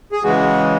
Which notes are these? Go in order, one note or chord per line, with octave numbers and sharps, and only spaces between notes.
G#4
C#3 E3 G#3 F#4